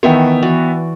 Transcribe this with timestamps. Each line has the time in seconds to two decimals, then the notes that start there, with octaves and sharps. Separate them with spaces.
0.03 D#3 E3 B3 E5 G5 C#6
0.43 E3 F#4 D5